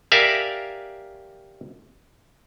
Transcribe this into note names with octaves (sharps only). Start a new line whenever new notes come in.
G4 A#4 D5 E5 F5 G#5